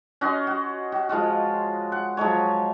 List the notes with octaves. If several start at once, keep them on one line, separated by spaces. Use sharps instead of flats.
C#4 F#4 D#5 C6
F#4
F#4
F3 G#3 F4 F#4
F#5
F3 F#3 G#3 C#5